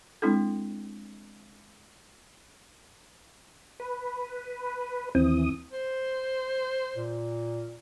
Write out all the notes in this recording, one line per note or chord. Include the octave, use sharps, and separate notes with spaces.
G#3 C4 D4 E4 A4
B4
D#2 E3 C4 D#6
C5
A#2